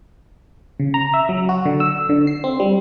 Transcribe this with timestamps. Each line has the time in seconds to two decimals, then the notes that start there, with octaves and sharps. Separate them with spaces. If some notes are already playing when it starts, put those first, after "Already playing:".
0.80 C#3
0.94 A#5
1.14 E5
1.29 F#3
1.49 F#4
1.66 D3
1.80 E6
2.09 D3
2.27 C7
2.44 C4
2.60 G3